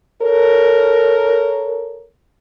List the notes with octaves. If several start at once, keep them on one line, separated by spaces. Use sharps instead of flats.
A4 A#4 C#5